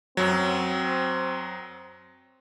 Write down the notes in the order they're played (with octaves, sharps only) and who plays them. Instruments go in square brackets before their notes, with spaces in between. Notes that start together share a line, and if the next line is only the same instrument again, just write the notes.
[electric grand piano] F#2 F#3 [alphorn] C4